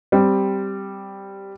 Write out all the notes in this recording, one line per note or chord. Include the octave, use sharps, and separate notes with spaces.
G3 C4